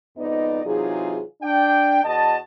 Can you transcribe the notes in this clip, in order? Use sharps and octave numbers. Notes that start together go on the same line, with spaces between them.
F2 G#2 B3 D#4 D5 D#5
C3 E3 F#3 D#4 F4 G#4
D4 G5
E2 F#4 D#5 A5